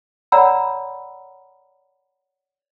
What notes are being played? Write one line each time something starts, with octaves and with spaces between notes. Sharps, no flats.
C#5 D5 F#5 A#5 B5 E6